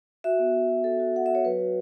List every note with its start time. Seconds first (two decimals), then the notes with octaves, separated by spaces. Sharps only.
0.24 F#4 E5
0.39 B3
0.54 F#4
0.69 F#4
0.84 F#4 A4
1.00 F#4
1.15 F#4 F#5
1.26 F#4 E5
1.35 C#5
1.44 F#3 B4
1.59 F#4